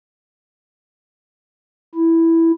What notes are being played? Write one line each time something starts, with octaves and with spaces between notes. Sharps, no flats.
E4